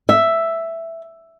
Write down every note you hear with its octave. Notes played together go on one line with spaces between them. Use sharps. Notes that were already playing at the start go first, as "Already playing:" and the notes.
E5